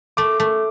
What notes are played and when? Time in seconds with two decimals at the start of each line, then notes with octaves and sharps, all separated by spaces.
0.17 A3 D6
0.40 A3